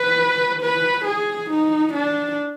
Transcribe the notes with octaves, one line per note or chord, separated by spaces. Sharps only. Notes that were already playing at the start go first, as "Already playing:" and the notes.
Already playing: B4
B4
G#4
D#4
D4